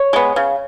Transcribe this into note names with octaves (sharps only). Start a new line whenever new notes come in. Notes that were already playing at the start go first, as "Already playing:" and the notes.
Already playing: C#5
G#3 B3
C#3